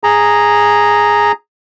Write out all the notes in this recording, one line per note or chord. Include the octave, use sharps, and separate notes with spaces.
G#4 A#5